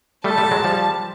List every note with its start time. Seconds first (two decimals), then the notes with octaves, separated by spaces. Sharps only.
0.24 G3 A3 A5
0.38 G3 A3
0.51 F#3 G#3
0.64 F3 G3